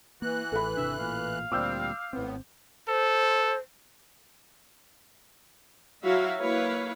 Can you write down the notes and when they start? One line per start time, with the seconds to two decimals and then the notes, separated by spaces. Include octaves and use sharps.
0.22 E3 A#3 F#4 F#6
0.52 A1 A4 B5
0.77 G#1 C3 D4 E5
0.99 A1 A#2 F5
1.52 D2 A#2 G3 C4 D6 E6 G6
2.13 G#1 A2 B3 C4
2.88 A4 C5
6.03 F#3 E4 F#4 E5 F5
6.39 A#3 E4 B4 C#5 F5